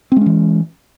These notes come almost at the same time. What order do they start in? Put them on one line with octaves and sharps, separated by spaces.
C4 G#3 C#4 E3